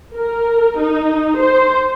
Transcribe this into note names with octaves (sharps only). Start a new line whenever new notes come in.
A#4
D#4
C5